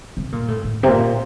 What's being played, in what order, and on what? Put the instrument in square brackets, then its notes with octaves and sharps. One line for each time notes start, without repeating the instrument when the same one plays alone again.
[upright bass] C3
A#2
A2
A2
C3
A#2